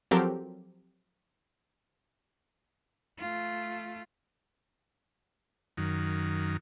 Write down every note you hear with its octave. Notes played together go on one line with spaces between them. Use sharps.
F3 F#3 C4 G4 A4 A#4
A3 F4
F#2 D#3